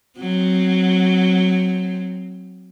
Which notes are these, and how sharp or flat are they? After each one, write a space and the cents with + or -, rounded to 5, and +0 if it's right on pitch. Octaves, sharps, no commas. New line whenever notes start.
F#3 +0 C4 +5